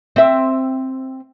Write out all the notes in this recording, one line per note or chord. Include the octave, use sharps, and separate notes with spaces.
C4 E5